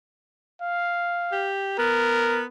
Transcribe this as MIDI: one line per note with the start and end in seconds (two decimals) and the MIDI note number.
0.61 1.52 77
1.32 1.76 67
1.79 2.45 59
1.79 2.45 70